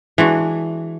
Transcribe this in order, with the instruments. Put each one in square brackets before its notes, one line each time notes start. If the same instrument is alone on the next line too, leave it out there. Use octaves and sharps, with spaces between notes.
[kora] E3 [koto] G#3 D4 F#4